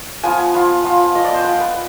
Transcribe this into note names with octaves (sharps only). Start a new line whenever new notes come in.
F3 B3 F4 G#5
F3 B3 F4
F3 B3 F4
F3 B3 F4 D#5
D5
C5
B3 F4 B4
B4